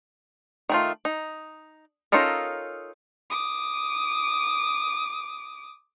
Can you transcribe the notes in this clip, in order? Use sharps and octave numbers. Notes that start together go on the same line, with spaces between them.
D#3 A3 F4
D#4
C#4 D#4 F4 A4 A#4
D6 D#6